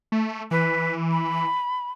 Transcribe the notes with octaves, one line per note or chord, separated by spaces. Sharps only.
A3
E3 B4
B5